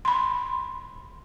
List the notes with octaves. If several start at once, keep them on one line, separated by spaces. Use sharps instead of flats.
B5 C6